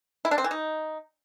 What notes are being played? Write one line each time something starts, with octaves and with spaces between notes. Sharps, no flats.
E4
D4
C4
E3
D#4